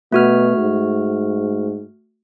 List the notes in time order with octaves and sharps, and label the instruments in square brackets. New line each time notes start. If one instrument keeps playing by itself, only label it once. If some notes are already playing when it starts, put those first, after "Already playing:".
[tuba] B2 [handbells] A3 F#4 F6
[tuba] G#2